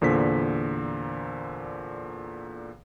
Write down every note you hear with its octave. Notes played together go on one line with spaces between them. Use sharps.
E2 A#2 D3 C5 B6